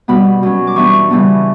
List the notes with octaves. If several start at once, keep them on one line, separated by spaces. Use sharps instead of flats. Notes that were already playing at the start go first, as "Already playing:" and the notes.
B2 G3 B3 B5
B2 F#3 C#4
D6
E3 G3 B3 D4 C#6
C#3 E3 G3 B3 D4